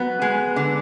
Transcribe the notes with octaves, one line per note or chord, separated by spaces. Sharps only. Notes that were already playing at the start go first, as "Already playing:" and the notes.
Already playing: F#3 B3
G#3
D3